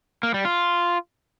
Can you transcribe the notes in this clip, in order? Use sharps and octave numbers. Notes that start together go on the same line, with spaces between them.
A#3
G3
F4